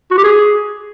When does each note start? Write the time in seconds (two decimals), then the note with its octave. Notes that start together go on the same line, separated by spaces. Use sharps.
0.11 F#4
0.18 G4
0.24 G#4